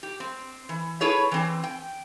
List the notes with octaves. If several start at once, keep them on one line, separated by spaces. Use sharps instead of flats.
G4
C4
E3
E4 G#4 A4 B4 C#5
E3 C4
G5